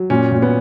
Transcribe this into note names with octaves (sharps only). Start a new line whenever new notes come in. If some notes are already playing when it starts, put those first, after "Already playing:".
Already playing: F#3
A#2 C#4
A#2
B3